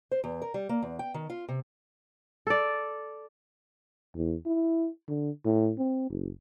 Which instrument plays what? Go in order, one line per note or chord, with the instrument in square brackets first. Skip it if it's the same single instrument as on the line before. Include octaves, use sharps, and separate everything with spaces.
[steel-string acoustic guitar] C5
E2
A#4
G3
A#3
E2
G5
D#3
F4
C3
[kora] A4 D5
[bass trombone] E2
E4
D3
A2
C4
F#1